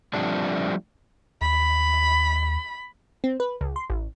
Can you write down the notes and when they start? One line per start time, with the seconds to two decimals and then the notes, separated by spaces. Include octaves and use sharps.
0.13 F3 G3 A3 C4 D4
1.41 D#2 B5
3.24 C4
3.40 B4
3.61 C#2
3.76 C6
3.90 A1